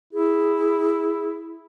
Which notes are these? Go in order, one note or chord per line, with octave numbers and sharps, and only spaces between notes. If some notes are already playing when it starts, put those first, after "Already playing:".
E4 G#4